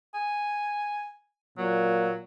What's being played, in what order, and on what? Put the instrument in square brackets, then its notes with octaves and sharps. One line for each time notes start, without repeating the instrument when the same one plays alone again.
[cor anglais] G#5
[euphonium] A#2 [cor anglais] F#3